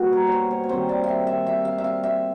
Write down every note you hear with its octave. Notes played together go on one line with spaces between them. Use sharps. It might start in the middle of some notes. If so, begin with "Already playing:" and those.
Already playing: B2 G3 A#3 F#4
A#4
C5 C#5
C#5
C#5
D#3 G3 C4 C5
D5
E5 F5
E5
E5
F5
E5
F5
E5